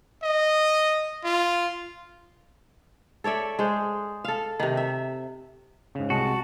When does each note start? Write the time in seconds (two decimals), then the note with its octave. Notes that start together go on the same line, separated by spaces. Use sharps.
0.23 D#5
1.24 F4
3.24 A4 C#5 D5 E5
3.59 G#3 C5
4.24 A4 F5
4.60 C3 D#3
4.77 E5
5.95 G#2 C#3
6.10 C2 G#3 F#4 A5